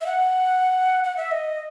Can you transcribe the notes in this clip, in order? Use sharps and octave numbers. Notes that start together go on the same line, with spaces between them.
E5
F#5
F#5
E5
D#5